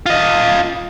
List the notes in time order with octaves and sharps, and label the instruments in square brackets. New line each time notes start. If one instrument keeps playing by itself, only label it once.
[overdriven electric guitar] F4 D#5